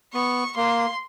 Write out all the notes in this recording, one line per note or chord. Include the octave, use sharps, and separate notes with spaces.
B3 C#6
A#3 C6